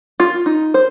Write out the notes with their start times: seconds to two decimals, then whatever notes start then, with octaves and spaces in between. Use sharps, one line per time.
0.20 F4
0.46 D#4
0.74 C5